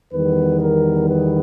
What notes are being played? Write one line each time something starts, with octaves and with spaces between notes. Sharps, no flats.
E2 D#3 G3 B3 B4
A#4
B4